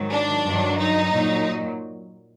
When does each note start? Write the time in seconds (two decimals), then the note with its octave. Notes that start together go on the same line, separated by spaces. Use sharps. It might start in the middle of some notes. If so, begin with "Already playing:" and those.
Already playing: G#2 D#3 F#3
0.11 D4
0.45 G2 D#3 F#3
0.78 D#4
1.11 A#2 F#3